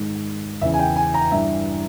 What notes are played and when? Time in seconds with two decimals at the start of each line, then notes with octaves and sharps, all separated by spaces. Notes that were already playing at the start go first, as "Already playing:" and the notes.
Already playing: G#2 D#3
0.61 E2 C#3 E3 E5
0.73 G#5
0.79 G5
0.96 G#5
1.14 A#5
1.32 G2 E3 E5